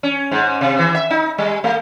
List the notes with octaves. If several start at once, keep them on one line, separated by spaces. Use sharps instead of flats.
C#4
G#2
C3
E3
E5
D#4
G3
A3